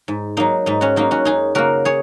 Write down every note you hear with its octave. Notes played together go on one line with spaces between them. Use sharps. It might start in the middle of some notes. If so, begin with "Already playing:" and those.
G#2
F#3 A#3 D#4
G#2 D#4
C#4 F#4
F#3 A#3 D#4
C#4 F#4
F#2 D#4 G#4
C#3 A#3 F#4 A#4
G#4 C#5